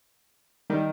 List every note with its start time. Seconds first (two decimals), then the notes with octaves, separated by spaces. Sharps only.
0.70 D#3 G3